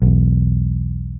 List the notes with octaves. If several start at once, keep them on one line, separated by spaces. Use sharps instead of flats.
B1 E2